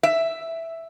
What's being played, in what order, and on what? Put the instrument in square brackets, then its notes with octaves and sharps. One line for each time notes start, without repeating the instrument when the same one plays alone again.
[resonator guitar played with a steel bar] E5